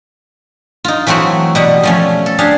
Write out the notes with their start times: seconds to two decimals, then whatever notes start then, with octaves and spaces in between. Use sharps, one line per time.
0.84 D#4 F4
1.07 E3 F#3 A3 C4 F#4
1.55 B2 G3 F#5
1.83 F3 A3 C#4
2.26 A4
2.38 D4 G4 G#4 F5